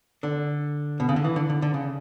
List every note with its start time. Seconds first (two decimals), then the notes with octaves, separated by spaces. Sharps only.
0.23 D3
1.00 B2
1.09 C#3
1.16 D3
1.24 E3
1.36 D3
1.50 D3
1.62 D3
1.74 C#3